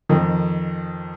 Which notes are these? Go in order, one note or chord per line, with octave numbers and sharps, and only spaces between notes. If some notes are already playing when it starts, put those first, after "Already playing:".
F2 D#3